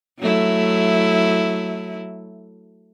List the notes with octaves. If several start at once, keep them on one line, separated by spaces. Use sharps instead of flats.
F#3 A3 E4